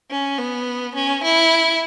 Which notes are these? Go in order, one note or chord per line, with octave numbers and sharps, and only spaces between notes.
C#4
B3
C#4
E4